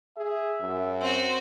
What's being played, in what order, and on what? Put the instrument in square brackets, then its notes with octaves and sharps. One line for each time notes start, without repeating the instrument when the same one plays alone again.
[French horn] G#4 [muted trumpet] E5
[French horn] F#2
[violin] C4 F#4